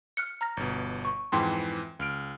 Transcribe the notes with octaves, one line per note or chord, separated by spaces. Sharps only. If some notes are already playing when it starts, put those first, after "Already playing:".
F6 F#6 C#7
A#5 F6 A#6
G1 B2
C#6
F2 G#2 E3 G5 A5 C6
C#2 F6 D7